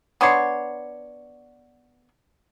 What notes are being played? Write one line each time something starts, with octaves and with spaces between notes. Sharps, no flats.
B3 D4 C#5 C6